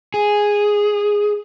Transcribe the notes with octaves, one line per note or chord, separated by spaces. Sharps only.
G#4